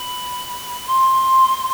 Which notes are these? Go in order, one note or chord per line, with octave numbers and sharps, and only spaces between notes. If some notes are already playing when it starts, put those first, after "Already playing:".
Already playing: B5
C6